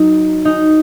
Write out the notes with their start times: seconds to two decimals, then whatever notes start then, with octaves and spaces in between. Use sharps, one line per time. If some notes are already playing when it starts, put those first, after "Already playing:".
Already playing: F#3 D#4
0.45 D#4